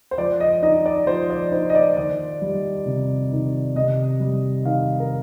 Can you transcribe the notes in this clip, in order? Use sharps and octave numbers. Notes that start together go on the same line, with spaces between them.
C5
F3 D5
D#5
D#4 D#5
D5
F3 C5
D5
D#4 C5
D#5
D5
D#3 D5
G3
C3
D#3
C3 D#5
G3
D#3 F5
A#4